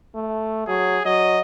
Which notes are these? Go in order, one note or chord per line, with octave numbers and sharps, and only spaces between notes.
A3
F#3 G#4
F#3 D#5